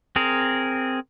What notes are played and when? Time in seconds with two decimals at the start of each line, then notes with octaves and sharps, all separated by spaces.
0.16 C4 G#4 A#4